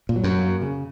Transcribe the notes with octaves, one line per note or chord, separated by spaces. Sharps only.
A#2
F#3
F#2
A#3
C#3